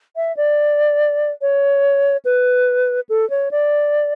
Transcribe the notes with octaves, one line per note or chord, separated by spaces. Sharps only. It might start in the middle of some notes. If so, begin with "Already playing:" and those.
E5
D5
C#5
B4
A4
C#5
D5